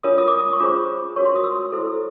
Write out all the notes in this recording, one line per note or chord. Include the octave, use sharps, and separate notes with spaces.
D4 F4 A#4 C#5 D#6
D#6
D6
D#6
C#6
D4 F4 G#4 C5 D6
D4 F#4 A#4 C#5 C#6
C6
D#6
E6
E4 A4 C5